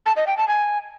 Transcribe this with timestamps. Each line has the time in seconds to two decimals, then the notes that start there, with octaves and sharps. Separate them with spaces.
0.06 A5
0.16 D#5
0.27 G5
0.37 A5
0.48 G#5